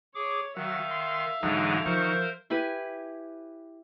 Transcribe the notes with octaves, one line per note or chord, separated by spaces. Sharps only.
G#4 C#5 D6
D#3 F#3 E5 F5
C6
G#2 D3 E3 F#3 G#3 D4 D#4
D#3 F3 A#4 C5 C#6
E4 G4 B4 G#5